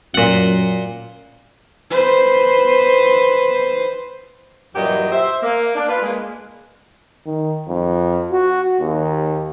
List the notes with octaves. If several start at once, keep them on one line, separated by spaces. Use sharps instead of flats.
F#2 A#2 F#5
B4 C5
G2 A#2 E3 F#3 G4 D#5
C5 E5
A#3
D4
F4 B4
G#3 A#3
D#3
F2
F#4
D#2